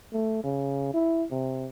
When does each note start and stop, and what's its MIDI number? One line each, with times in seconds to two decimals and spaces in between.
0.13 0.40 57
0.44 0.93 49
0.94 1.25 64
1.31 1.68 48